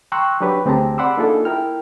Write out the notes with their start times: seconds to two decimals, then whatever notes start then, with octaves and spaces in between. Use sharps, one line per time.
0.12 G5 A#5 C6 C#6 E6 F#6
0.40 F#3 D4 G4 B4 C#5
0.65 D2 C4 G4 G#4 A5 A#5
0.98 D5 F#5 B5 C6 D6 E6
1.17 A#3 D4 D#4 F4 G#4 A4
1.45 E4 A#4 G5 F6